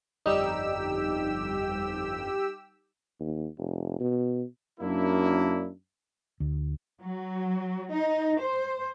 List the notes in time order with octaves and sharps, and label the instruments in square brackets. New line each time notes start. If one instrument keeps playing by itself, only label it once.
[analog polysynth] G1 F2 [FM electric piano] G3 D#4 [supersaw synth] G4 E6
[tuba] D#2
F1
B2
[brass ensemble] F#2 A#3 D4 E4
[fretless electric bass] D2
[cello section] F#3
D#4
C5